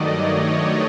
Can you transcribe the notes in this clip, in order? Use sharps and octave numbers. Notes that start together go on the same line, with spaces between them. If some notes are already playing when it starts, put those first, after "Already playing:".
Already playing: G2 D#3 F#3 A3 D5 D#5
C#5